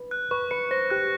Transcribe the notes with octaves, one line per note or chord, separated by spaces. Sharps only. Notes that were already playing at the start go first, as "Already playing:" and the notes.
Already playing: B4
F#6
B4 C#6
B4 C#7
C5 A#6
G4 F#6